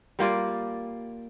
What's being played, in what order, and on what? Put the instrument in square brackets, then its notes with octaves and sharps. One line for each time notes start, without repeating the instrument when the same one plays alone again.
[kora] G3 A#3 F4 D5